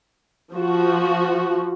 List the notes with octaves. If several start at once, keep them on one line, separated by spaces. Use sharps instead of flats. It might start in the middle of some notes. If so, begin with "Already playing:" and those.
F3 F#4